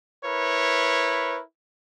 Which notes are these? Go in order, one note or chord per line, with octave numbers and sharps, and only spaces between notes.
E4 A#4 B4 C#5